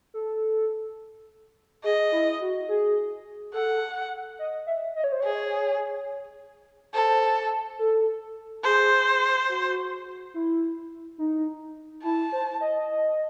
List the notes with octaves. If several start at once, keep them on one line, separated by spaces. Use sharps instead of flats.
A4
G#4 D#5
E4
F#4
G#4
A4 F#5
D#5
E5
D#5
C#5
C5
G#4 C#5
A4 C5
A4
G#4 C5
F#4
E4
D#4
E4 A5
C5
D#5